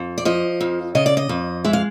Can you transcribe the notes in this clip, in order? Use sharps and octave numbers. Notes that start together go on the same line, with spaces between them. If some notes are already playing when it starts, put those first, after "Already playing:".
Already playing: F2
D5
F3 D#5
F2
C#3 D#5
D5
D#5
F2
G#3 E5
F5